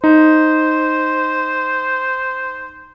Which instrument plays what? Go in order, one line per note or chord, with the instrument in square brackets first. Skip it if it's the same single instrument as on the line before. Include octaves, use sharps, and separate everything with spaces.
[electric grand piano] D#4 [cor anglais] C5